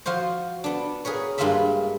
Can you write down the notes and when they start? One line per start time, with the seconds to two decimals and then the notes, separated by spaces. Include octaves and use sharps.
0.06 F3 F4 F#4 C5
0.64 B3 D4
1.05 G#4 A#4 B4 C#5
1.38 G2 G#3 A#3 F4 E5 B5